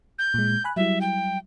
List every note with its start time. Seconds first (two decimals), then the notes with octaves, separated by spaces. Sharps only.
0.19 G6
0.34 A#2 G#3
0.64 G#5 B5 F#6
0.76 F#3 G3 E4 E5
1.01 G5